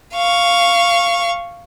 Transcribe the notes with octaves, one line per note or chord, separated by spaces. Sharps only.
F5 C#6